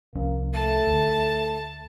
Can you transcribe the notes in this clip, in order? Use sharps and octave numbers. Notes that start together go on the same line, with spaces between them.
C2 F3 A#3 C#4
A3 A5
D2